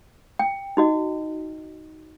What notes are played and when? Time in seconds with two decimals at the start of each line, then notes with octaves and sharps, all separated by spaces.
0.39 G5
0.77 D#4 F#4 D#5